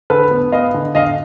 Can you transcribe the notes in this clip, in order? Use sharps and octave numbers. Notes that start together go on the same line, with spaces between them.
D3 A4 B4
B3
B3 D#5 F5
D3
D3 D#5 F5